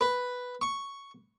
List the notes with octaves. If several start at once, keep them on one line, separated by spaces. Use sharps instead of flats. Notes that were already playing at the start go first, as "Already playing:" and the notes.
B4
C#6